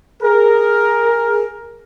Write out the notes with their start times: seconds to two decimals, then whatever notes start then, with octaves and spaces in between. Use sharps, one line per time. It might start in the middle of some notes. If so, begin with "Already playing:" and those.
0.22 G#4 A#4